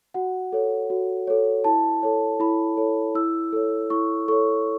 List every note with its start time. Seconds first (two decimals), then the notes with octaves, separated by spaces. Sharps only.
0.14 F#4 F#5
0.53 A4 C#5
0.90 F#4
1.27 A4 C#5
1.64 E4 A5
2.03 A4 C#5
2.40 E4 B5
2.77 A4 C#5
3.15 E4 E6
3.53 A4 C#5
3.90 E4 C#6
4.28 A4 C#5 C#6